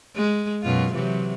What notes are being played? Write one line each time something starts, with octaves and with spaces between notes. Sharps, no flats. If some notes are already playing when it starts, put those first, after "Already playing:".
G#3
F#2 B2 F4
C3 E3 F#3